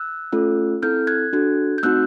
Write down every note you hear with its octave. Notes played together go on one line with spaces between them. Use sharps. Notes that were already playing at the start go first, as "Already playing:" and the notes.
Already playing: E6 F#6
A3 C#4 F4 A4
C4 E4 A4 F6 G6
F#6 G#6
D4 F#4 A4
G6
A3 C4 D#4 F#4 E6 F#6